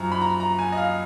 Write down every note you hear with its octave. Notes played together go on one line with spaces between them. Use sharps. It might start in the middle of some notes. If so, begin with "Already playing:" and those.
Already playing: F#2 F3 A#5
B5
A#5
A#5
G#5
D#5
F5